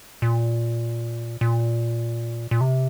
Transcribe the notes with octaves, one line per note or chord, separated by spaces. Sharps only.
A#2
A#2
A#2
C3